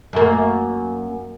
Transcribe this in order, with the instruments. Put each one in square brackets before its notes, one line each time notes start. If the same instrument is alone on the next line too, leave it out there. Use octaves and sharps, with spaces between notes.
[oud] F#2 A#3